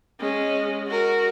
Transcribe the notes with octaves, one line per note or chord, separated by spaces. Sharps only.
G#3 C#4
F#4 A#4